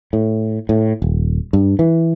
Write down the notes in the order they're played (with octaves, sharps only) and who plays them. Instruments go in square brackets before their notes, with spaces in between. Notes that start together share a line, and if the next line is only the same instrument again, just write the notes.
[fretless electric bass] A2
A2
D#1
G2
E3